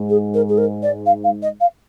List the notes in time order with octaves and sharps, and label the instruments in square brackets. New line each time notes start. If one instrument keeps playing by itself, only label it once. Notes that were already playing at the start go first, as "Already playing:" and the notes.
Already playing: [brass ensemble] G#2
[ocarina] G#4
A#4
G#4
A#4
D5
F5
F5
D#5
F5